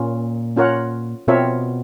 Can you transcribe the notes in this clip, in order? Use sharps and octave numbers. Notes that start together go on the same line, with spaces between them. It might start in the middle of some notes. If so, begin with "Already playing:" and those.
Already playing: A#2 A#3 C#4 F4
C#4 F4 A#4 C#5 F#5
B2 C4 F4 A#4 C#5 E5